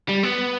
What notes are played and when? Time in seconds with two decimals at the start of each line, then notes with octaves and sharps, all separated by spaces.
0.09 G3
0.23 B3